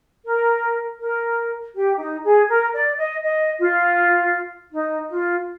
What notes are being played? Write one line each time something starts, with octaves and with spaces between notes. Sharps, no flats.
A#4
A#4
G4
D#4
G#4
A#4
D5
D#5
D#5
F4
D#4
F4